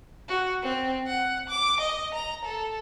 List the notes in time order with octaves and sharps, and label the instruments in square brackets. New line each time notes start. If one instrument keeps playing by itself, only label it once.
[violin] F#4
C4
F#5
D6
D#5
A#5
A4